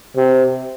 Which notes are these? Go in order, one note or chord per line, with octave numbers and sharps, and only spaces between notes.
C3